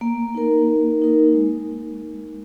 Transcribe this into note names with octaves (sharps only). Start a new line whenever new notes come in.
A#3
D#4 A#4
A#3
D#4 A#4
G#3